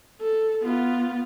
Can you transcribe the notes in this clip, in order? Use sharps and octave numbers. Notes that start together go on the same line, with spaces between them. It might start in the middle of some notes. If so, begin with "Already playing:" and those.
A4
B3 F4